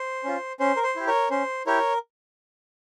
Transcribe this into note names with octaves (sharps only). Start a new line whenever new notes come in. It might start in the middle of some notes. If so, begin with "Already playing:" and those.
Already playing: C5
C#4 F4
C#4 C5
A#4
C5
E4 G4
A#4 C#5
C#4 C5
E4 G4 A#4 C#5